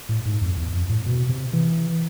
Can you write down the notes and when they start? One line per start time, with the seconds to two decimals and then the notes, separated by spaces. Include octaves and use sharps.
0.09 A2
0.25 G#2
0.41 F2
0.57 E2
0.73 F2
0.89 A2
1.06 B2
1.29 C3
1.53 E3